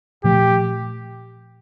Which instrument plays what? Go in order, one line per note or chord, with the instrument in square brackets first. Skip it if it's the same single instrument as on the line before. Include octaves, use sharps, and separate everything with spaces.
[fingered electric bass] A#2 F3 A3 [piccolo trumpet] G4